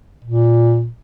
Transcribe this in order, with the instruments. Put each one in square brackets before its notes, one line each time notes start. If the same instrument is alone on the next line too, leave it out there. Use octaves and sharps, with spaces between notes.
[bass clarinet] A#2